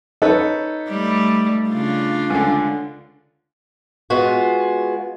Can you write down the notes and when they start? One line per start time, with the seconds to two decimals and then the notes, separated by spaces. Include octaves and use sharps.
0.22 D#4 A4 B4 C#5
0.88 G3 A3
1.69 C#3 D4 F4
2.30 C#2 D3
4.10 G#3 B3 F4 F#4